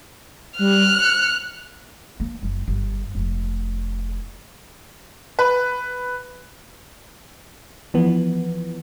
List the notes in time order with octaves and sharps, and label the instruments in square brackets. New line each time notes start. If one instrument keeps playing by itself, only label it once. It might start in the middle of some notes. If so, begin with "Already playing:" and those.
[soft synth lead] G3 [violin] F6 F#6
[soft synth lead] C#7
[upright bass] A#3
F#1
G1
F1
[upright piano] B4
[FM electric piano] E3 F3 B3